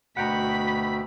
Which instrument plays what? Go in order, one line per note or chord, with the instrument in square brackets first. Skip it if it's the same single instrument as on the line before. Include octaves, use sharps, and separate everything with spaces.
[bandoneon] D2 B2 [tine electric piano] F#5 G5 A#5 [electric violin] B5 B6